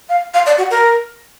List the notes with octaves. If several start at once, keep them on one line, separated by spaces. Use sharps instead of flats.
F5
F5
D5
F#4
A#4